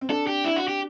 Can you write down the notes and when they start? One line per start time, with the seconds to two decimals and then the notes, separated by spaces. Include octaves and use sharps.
0.01 C4
0.09 D4 A4
0.27 G4
0.44 E4
0.56 F#4
0.68 G4